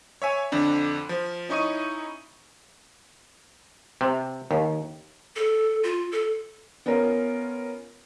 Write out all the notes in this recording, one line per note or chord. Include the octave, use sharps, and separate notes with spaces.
C#5 E5 G#5
F2 D3 D4
F3
C#4 D#4 E4 C#6 D#6 D#7
C3
D#2
A4
F4
A4
B3 C#4 F4 A#4